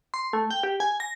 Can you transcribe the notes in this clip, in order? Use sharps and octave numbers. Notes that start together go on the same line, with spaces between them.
C6
A3
G5
G4
G#5
A#6